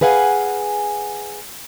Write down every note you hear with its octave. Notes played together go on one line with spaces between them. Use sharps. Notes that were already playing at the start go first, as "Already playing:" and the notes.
G#4 B4 F5 F#5 G#5